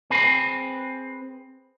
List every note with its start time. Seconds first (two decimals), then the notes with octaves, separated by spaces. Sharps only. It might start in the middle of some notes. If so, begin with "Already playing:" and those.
0.10 C4 G#4 B4